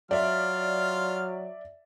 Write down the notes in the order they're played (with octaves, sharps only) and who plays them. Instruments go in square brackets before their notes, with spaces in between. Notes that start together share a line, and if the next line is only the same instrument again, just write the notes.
[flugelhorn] F#3 [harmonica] F4 F6 [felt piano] D5 E5